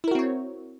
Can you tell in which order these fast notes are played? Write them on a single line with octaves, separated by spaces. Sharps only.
E4 A#4 F#4 C4 C#5